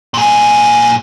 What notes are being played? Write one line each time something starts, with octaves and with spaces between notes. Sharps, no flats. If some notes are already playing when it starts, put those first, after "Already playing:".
A#2 G#4